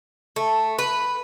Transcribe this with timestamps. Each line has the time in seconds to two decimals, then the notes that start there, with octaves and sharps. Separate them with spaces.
0.36 A3
0.79 B4